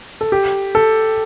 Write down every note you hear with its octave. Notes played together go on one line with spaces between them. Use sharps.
A4
G4
A4